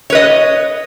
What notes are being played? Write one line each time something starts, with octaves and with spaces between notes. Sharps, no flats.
B4 C#5 D#5